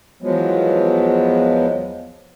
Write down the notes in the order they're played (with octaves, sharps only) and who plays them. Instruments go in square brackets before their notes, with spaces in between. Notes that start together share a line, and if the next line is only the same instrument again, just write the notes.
[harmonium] E2 F3 F#3 G#3 B3